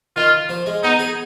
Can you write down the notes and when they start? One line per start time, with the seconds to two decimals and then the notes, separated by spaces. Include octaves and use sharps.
0.16 D#3 F4
0.49 F3
0.66 G#3
0.83 B3 D#4
0.99 G#4